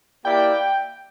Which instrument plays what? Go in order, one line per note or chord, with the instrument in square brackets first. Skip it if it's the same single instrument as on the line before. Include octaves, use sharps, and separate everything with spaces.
[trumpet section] A#3 E4 G4 D5 [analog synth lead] G5